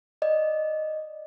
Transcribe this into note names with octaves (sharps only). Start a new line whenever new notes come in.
D5 D#5